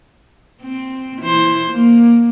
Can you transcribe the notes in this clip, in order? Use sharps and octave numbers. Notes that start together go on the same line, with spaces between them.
C4
E3 E4 C5
A#3